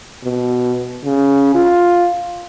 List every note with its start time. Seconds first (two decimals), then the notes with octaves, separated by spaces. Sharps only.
0.24 B2
1.04 C#3
1.55 F4